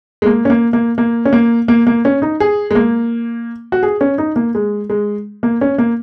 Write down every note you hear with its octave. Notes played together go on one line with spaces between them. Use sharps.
G#3
A#3
C#4
A#3
A#3
A#3
C#4
A#3
A#3
A#3
C#4
D#4
G#4
G#3
A#3
F#4
G#4
C#4
D#4
A#3
G#3
G#3
A#3
C#4
A#3